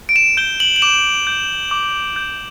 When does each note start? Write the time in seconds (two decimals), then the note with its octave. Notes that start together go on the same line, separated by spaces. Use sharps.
0.09 D7
0.16 E7
0.37 G6 G7
0.60 F#7
0.76 F#7
0.82 D6 E7
1.27 G6
1.71 D6
2.16 G6